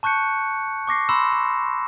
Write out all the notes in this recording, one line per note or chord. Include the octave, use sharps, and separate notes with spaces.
A5 C#6 F#6 G6 C#7
C#6 D6 A#6 C7
B5 C6 E6 E7
E7